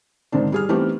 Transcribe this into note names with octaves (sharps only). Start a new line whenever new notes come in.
G#2 D3 D#3 C4 D4
G3 G#4 F6
E3 A3 B3 C4 D#4 G4